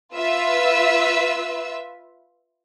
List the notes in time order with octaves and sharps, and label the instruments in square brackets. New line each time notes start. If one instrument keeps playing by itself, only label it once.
[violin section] F4 B4 E5 E6